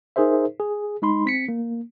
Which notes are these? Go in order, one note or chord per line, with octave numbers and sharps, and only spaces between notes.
D#4 G#4 A#4 C5 E5
G#4
G#3 D#4 B5 C6
C4 B6 C#7
A#3